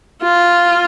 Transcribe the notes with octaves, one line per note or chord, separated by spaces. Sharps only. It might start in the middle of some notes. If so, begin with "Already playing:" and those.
F4